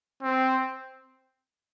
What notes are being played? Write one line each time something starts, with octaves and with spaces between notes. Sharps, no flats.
C4